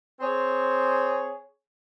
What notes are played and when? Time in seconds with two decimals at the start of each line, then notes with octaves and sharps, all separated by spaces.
0.20 C4 G#4 C#5